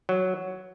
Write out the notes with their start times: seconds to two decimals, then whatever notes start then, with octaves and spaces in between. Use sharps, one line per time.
0.09 F#3